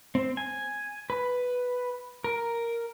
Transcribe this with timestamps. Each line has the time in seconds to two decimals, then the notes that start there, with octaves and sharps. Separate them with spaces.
0.15 C4
0.37 G#5
1.10 B4
2.24 A#4